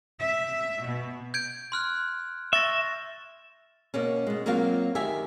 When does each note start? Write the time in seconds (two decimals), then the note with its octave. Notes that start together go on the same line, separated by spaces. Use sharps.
0.20 E5
0.83 B2
1.34 G6 G#6 D7
1.72 C6 F6 F#6
2.53 E5 C#6 A6 A#6
3.94 B2 A#3 C#4
4.26 B2 G#3
4.46 F#3 A#3 C4 F4 F#4 F5
4.95 D2 D#3 G4 E5 G#5